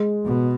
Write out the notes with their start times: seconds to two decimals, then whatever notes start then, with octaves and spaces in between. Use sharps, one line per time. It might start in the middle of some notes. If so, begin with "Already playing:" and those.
Already playing: G#3
0.25 B2